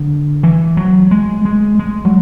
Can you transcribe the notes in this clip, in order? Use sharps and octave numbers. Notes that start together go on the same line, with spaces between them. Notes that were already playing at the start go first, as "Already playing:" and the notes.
Already playing: D3
E3
F#3
G#3
G#3
G#3
F#3